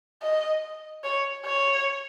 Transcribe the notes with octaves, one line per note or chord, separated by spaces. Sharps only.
D#5
C#5
C#5